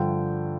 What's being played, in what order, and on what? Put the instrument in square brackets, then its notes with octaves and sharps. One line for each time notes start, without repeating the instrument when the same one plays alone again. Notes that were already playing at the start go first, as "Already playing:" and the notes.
Already playing: [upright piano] G2 D3 F3 G5